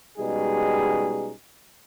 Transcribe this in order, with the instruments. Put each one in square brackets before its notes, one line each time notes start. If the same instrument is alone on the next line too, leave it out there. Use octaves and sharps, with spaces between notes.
[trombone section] B2 G3 G#3 C#4 D#4 G#4